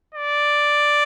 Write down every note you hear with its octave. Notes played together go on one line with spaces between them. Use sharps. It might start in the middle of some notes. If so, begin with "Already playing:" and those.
D5